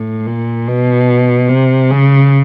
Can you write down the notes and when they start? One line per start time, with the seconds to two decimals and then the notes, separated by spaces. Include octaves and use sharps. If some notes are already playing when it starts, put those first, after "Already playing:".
Already playing: A2
0.27 A#2
0.68 B2
1.49 C3
1.91 C#3